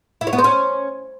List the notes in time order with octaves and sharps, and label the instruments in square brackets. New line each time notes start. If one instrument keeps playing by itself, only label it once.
[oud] E4
C#5
B3
C5
C#4